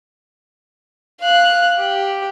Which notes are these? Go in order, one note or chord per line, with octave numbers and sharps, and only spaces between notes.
F5 F#6
G4